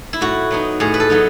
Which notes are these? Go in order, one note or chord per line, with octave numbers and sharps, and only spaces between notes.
E4
A2 F#4
F#3 B3 D#4
A2 G#4
B4
A4
F#3 B3 D#4